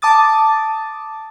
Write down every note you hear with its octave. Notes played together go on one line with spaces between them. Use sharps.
A5 D6 D#6 A6